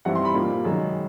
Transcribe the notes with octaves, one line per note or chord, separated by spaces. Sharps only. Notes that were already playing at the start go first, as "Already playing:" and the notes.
G2 E3 G3 C4 E4 F#5
C6
B5
A#2 G3 A#3
F#2 D#3 G#3